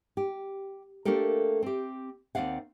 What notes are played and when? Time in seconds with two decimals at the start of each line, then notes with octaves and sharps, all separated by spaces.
0.17 G4
1.05 A3 A#3 D4 G4 A4 A#4
1.63 C4 G4
2.35 D#2 F#3 C4 D5 F5 F#5